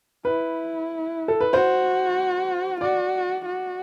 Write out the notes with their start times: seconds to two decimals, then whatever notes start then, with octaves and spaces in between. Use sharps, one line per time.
0.25 E4 B4
1.28 A4
1.41 B4
1.53 F#4 C5
2.81 F#4 D5
3.45 F#4